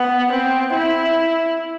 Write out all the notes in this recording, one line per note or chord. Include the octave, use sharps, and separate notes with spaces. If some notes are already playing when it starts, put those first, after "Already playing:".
Already playing: B3
C4
E4